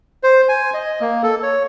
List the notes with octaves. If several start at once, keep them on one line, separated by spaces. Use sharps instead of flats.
C5
G#5
D#5
A#3
A4
C#5